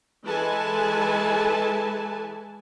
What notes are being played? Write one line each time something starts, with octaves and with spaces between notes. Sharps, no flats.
E3 G#3 A4 B4 G#5 A5